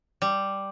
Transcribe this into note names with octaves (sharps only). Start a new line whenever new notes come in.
G3